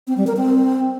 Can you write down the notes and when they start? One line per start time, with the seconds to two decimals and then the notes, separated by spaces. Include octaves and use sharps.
0.08 C4
0.17 G3
0.27 A#4
0.37 C4